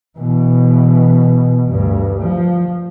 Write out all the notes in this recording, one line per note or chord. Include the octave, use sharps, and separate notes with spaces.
B2 E3
D2 G2
F3